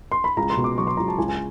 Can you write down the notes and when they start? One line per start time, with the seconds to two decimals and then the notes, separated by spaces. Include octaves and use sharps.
0.12 C6
0.24 B5
0.37 C#2 A#5
0.50 C6
0.57 B2
0.64 D6
0.77 F#3 C#6
0.87 C6
0.97 C#2 A#5
1.08 A5
1.18 C#2 G#5
1.29 G#5